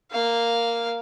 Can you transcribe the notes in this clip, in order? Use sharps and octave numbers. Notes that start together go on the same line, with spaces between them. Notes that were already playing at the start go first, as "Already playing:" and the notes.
A#3 F5